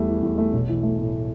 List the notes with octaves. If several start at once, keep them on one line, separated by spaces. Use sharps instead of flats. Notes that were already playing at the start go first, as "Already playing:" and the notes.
Already playing: E2 G3 A3 E4
E3
E2
A3
B1
E3
A3
A2